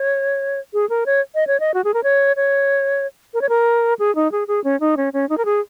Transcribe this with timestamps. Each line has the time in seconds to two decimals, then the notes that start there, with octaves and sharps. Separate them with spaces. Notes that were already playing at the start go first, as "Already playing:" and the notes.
Already playing: C#5
0.73 G#4
0.89 A#4
1.06 C#5
1.35 D#5
1.47 C#5
1.60 D#5
1.74 F#4
1.84 G#4
1.94 A#4
2.03 C#5
2.36 C#5
3.34 A#4
3.41 C#5
3.49 A#4
3.99 G#4
4.15 D#4
4.32 G#4
4.48 G#4
4.64 C#4
4.80 D#4
4.97 C#4
5.13 C#4
5.29 D#4
5.38 A#4
5.45 G#4